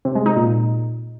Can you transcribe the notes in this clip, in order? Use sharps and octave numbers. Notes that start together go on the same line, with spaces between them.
C3
G#3
D#4
A#2